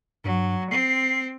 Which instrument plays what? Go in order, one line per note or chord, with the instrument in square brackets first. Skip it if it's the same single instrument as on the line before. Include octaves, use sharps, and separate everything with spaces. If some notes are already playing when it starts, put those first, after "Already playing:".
[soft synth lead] G2 [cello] F#3
[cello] C4 [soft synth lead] C7